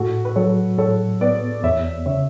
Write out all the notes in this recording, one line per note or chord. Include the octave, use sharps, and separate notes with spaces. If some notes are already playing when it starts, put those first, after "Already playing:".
Already playing: A2 F#4 A4
B4
F#3 A4 C#5
A2 A4 C#5
B3 B4 D5
E2 C#5 E5
C#3 C#5 E5